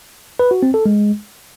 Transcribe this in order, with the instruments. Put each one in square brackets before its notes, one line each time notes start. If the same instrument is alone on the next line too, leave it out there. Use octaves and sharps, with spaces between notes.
[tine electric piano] B4
F#4
C4
A4
G#3